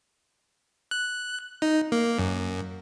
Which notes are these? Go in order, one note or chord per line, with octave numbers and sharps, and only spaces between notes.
F#6
D#4
A#3
F#2